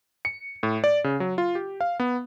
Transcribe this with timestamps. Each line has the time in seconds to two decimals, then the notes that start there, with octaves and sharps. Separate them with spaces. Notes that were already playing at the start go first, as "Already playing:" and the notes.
0.25 C#7
0.63 A2
0.84 D5
1.04 C#3
1.20 F#3
1.38 F4
1.55 G4
1.81 F5
2.00 B3